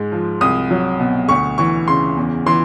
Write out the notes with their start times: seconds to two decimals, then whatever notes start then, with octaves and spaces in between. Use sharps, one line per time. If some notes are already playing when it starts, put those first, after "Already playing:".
Already playing: G#2 G#3
0.12 F3
0.41 C2 D#6
0.70 F#3
1.00 B2
1.28 D2 C#6
1.58 E3 C#6
1.88 C#3 C6
2.17 E2
2.46 E3 C6